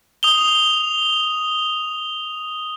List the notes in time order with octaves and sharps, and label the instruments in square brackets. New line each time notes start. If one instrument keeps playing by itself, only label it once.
[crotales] D#6 F7 G7